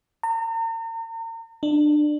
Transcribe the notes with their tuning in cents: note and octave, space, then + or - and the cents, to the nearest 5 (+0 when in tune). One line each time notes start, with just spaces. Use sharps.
A#5 -40
D4 +20